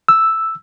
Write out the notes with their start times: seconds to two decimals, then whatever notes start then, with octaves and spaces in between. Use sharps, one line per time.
0.08 E6